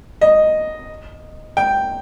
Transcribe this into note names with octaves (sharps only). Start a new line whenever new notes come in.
D#5
G5